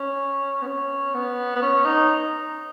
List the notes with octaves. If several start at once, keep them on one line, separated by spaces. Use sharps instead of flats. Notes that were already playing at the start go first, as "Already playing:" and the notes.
Already playing: C#4
B3
C#4
B3
B3
C#4
D#4